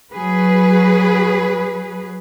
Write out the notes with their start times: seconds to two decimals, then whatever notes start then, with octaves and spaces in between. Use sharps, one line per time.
0.11 F#3 G#4 B4